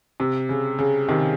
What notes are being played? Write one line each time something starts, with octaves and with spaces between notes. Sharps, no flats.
C3
C#3
C#3
C3 D#3